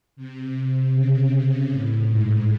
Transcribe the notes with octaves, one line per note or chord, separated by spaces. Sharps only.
C3
C#3
A2
G#2